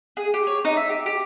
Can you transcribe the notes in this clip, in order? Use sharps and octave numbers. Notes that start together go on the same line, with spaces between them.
G#4
G4
C#5
D#4
E5
G4
G4